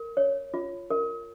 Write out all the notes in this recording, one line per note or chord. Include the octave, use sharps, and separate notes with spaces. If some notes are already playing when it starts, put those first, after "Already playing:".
Already playing: A#4
C#5
F4
A#4